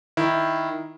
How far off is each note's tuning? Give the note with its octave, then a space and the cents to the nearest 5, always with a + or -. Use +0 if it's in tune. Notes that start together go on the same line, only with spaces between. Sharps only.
D#3 +5 E4 +0